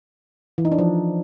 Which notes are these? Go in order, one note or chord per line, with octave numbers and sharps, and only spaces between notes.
E3
D#4
D4
F3